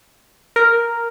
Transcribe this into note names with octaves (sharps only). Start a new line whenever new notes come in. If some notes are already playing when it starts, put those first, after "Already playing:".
A#4